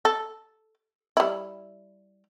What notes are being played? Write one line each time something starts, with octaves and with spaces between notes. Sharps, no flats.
A4
G3 E4